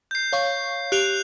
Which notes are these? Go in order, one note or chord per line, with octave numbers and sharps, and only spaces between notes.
G6 C7
C#5 F5 C#6
G4 F#6 C7 F7